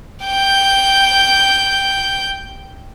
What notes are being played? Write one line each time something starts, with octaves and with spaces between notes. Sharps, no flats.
G5 G6